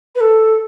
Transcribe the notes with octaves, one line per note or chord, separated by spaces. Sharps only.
B4
A4